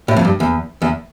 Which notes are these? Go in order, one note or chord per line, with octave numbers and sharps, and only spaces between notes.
A2
F2
G2
E2
E2